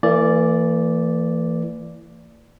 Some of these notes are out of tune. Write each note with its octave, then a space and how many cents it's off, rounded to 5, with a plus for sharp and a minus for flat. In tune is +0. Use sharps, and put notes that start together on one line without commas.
E3 +15 A#3 -45 D5 -5